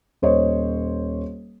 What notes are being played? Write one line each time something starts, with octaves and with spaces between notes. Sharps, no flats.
D#1 C5 C#5 D#5